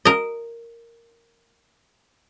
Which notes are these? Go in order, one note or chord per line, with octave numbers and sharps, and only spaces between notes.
A#4 D#5